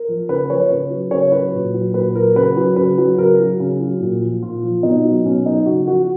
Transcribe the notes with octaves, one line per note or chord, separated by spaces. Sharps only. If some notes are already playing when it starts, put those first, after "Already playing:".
Already playing: A#4
F3
C#3 B4
F3 C#5
C#3 B4
F#3
C#3 C#5
F#3 B4
A#2
F#3
A#2 B4
F#3 A#4
C#3 B4
F#3
C#3 B4
F#3
C#3 A#4
F#3
C#3
F#3
A#2
F3
A#2 F4
F3
B2 D#4
F#3
B2 C#4
F#3 D#4
C#3 F#4
F3 F#4